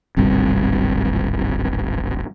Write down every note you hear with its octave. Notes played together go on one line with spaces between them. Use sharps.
D1 G#1 C3 G3